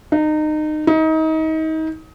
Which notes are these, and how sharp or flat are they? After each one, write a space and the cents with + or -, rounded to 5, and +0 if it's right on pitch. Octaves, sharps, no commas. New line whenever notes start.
D#4 -25
D#4 +30